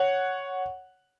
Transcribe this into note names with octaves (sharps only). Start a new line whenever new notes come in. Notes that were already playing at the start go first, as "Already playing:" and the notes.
Already playing: C#5 F#5